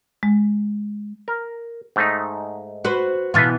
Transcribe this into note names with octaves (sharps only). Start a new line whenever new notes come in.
G#3
A#4
G#2 A3 D#4
F#4 B4 C5
B2 E3 B3 F4 A4 B4